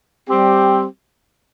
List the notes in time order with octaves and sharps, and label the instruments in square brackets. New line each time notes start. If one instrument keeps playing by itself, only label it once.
[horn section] G3 C4 G4